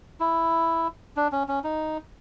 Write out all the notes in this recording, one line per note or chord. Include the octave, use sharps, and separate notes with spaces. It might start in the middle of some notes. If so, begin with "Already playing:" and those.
E4
D4
C#4
C#4
D#4